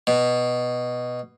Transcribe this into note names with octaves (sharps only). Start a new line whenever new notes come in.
B2